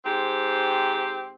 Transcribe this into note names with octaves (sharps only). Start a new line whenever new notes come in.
G#2 C4 G4